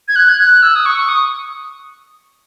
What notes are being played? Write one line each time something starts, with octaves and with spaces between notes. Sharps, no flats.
G#6
F#6
G#6
F#6
E6
D#6
C#6
D#6